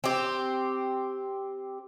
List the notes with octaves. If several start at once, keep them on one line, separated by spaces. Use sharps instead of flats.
C4 G4